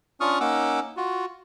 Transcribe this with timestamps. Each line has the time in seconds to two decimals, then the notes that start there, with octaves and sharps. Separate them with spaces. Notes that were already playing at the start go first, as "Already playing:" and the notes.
0.21 C#4 D4 F4 C#6 D#6 F6
0.40 A#3 C#4 D#4 F#5 D6 E6
0.97 F4 F#4